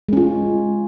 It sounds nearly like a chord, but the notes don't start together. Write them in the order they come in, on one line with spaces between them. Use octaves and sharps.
G#3 C#4 F4